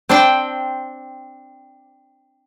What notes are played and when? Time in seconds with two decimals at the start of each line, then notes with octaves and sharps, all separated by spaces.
0.09 C4 D4 C5 D5 G5